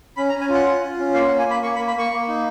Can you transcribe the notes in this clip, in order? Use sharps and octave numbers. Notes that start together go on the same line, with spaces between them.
C#4 B5
A#5
C#4
G#5
F4
F#5
F4
F4
C#4
A#3 F5
F#5
A#3
G#5
A#3 B5
A#3 C#6
B5
A#3
B5
A#3 C#6
A#3
D#4